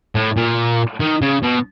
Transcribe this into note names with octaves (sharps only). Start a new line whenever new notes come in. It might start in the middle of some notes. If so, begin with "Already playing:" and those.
A2
A#2
D#3
C#3
B2